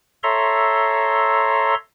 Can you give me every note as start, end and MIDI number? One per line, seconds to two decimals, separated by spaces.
0.23 1.75 69
0.23 1.75 73
0.23 1.75 76
0.23 1.75 82
0.23 1.75 84